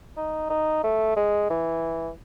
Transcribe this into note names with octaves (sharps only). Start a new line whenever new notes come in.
D#4
D#4
A3
G#3
E3